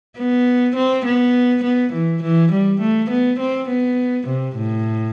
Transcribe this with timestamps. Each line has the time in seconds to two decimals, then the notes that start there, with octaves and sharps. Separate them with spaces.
0.18 B3
0.75 C4
1.05 B3
1.64 B3
1.93 E3
2.22 E3
2.51 G3
2.81 A3
3.10 B3
3.39 C4
3.69 B3
4.27 C3
4.56 A2